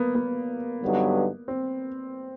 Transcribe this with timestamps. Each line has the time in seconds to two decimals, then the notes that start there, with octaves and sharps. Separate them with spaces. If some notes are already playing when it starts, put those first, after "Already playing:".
Already playing: A#3 B3
0.15 B3
0.82 G2 D3 F#3 B3 D#4
1.48 C4